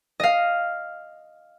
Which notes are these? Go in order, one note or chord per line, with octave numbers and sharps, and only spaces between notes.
D#5 F5